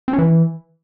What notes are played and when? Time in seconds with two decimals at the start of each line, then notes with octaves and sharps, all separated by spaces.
0.08 C4
0.13 C#4
0.18 E3